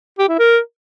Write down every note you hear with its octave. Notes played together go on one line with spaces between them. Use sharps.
G4
E4
A#4